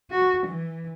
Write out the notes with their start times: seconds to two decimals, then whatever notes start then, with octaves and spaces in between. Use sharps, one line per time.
0.11 F#4
0.46 E3